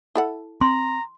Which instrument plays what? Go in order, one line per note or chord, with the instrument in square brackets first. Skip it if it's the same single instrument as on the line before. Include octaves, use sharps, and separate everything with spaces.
[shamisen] E4 A4 F#5
[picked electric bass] C4 [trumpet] A#5 [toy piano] C6